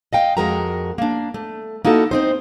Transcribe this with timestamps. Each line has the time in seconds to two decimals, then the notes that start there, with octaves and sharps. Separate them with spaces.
0.13 D#5 F5 G5
0.37 F2 G#3 F#4 A#4 G5 A#5
0.98 A#3 D4
1.34 A3
1.85 A#3 D#4 E4 F#4 A4
2.11 C4 D#4 C5